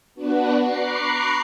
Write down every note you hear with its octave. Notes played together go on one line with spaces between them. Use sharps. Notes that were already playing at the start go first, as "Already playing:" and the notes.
B3 D4 F#4 B4
A#5 B5 C#6 D6 F#6 C7